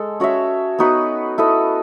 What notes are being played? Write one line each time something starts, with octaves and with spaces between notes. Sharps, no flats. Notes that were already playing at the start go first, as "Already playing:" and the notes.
Already playing: G#3 A4
C#4 F#4 C#5 E5
B3 D#4 F#4 B4
E4 A4 D#5